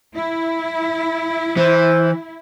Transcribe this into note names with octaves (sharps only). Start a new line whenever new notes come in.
E4
E3 C5